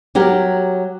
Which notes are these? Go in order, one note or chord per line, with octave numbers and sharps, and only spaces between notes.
F#3 G4 A#4